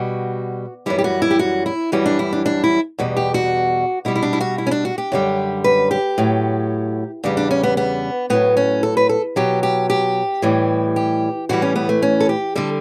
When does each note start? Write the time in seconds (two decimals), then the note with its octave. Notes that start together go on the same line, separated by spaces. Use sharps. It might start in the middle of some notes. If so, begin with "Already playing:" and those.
Already playing: B2 G3 F#4
0.86 F#2 E3 G3 E4
0.98 G4
1.04 F#4
1.22 E4
1.31 G4
1.39 F#4
1.66 E4
1.92 F#2 E3 G3 F#4
2.06 D4
2.19 E4
2.32 D4
2.46 D4
2.64 E4
2.98 E2 B2 G3
3.17 G4
3.34 F#4
4.05 B2 G3 E4
4.15 E4
4.22 D4
4.33 E4
4.41 F#4
4.58 E4
4.67 C#4
4.71 D4
4.85 F#4
4.98 G4
5.12 F#2 D3 G3
5.64 B4
5.91 G4
6.18 A2 F#3
7.24 E2 C#3 G3 D4
7.37 D4
7.51 C#4
7.63 B3
7.77 B3
8.30 A2 F#3 B3
8.57 C#4
8.83 A4
8.97 B4
9.09 A4
9.36 B2 F#3 G4
9.63 G4
9.90 G4
10.42 A2 E3 G3
10.96 G4
11.49 A2 E3 G3 F#4
11.62 C#4
11.76 B3
11.89 A3
12.02 C#4
12.20 A4
12.29 G4
12.55 D3 G3 A4